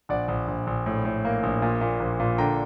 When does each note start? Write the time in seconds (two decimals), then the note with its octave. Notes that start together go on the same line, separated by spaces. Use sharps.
0.09 A#1 D5 F#5
0.28 A#1
0.48 A#1
0.67 A#1
0.86 A2
1.05 A2
1.25 A#3
1.43 A#1
1.62 A#2
1.81 A#2
2.00 A#1
2.20 A#2
2.38 D3 G5 A#5